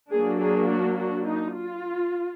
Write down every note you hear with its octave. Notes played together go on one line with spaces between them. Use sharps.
F#3 A#3 D4 G#4
G#4
F#4
F#4
D#4
F4